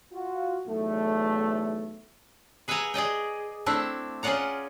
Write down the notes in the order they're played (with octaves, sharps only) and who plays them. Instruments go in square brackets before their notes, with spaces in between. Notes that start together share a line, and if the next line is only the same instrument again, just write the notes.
[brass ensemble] F4 F#4
B1 E2 A2 A3
[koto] G#4 B4 E5 F#5 G#5 A#5
G#4 D5 D#5 G5
A3 C4 D4 E4
C#4 F4 G#4 D5 F#5 A#5